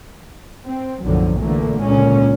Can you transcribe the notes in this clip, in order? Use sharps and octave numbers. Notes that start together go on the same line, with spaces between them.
C4
B1 F#2 A2 D3 F3 F#3
E2 A#2 D3 E3 A3 A#3
C#2 A#2 D3 G#3 C#4